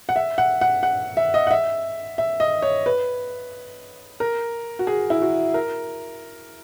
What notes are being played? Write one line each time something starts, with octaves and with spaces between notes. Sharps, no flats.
F#5
E5
F#5
F#5
F#5
E5
D#5
F#5
E5
E5
D#5
C#5
B4
A#4
F#4
G#4
E4
F#4
A#4